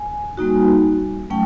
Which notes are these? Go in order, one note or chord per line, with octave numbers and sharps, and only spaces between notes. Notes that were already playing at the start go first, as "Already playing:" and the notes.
Already playing: G#5
G3 A#3 D#4 F#4
F#3 A3 C#4 G5